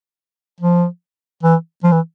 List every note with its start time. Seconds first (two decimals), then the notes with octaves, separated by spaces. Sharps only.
0.61 F3
1.43 E3
1.84 F3
1.92 E3